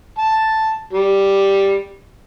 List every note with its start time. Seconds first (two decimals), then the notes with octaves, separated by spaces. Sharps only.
0.18 A5
0.93 G3